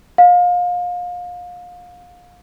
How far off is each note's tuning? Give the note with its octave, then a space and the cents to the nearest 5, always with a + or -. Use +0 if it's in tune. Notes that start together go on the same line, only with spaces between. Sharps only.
F5 +30